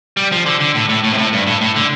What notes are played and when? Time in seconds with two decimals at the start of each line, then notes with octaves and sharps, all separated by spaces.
0.17 G3
0.32 F3
0.46 D3
0.60 D3
0.75 A2
0.89 A2
1.04 A2
1.13 C3
1.18 A2
1.33 G2
1.47 A2
1.61 A2
1.76 D3